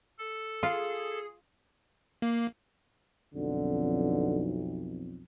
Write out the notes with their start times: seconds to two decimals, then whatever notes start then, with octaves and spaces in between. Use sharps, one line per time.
0.18 A4
0.63 F4 G#4
2.22 A#3
3.34 B1 F2 D3